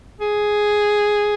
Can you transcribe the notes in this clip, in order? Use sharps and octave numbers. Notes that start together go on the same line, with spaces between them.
G#4